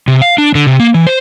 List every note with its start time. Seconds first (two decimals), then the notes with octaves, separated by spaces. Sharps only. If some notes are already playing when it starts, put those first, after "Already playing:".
0.08 C3
0.22 F5
0.38 D4
0.55 D3
0.67 C3
0.80 A#3
0.94 E3
1.07 C5